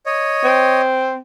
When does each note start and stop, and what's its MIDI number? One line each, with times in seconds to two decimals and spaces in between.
0.06 0.81 73
0.06 0.81 75
0.44 1.18 60